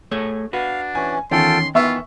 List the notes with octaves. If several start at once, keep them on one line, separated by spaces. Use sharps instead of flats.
A3 G#4 C#5
D4 F#4 B4 F5
E3 C#4 G#5
E2 D#3 C#4 F4 A4 G5 C6
D#3 E3 B3 F4 E5 C#6 E6